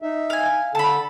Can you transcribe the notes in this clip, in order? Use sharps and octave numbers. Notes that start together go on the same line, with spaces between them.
D#4 E5
F5 G#5
D3 A4 A5 B5